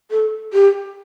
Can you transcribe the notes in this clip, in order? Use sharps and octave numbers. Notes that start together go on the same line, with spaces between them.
A4
G4